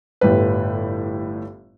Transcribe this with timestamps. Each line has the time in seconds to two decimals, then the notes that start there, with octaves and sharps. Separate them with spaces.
0.21 G1 A2 G3 B4